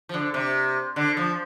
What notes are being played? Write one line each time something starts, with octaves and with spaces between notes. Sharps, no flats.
F3
D3
C3
D3
F3